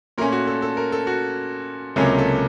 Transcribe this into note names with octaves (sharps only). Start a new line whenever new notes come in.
A#2 A3 C#4 A#4
F#4
A4
A4
A#4
A4
F#4
C#2 C3 F#3 A#3 C#4 A4
A4